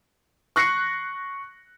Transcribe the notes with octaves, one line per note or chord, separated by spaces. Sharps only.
C#6 F#6 A#6 C7 C#7